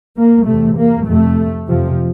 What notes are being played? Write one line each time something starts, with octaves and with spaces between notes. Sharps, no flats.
A#3
E2 C3 A3
A#3
F2 C3 A3
F2 C3 F3